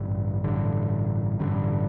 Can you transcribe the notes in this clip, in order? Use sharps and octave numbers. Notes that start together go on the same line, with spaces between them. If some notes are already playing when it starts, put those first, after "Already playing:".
Already playing: A1 G2 D3
A1 G2 D3
A1 G2 D3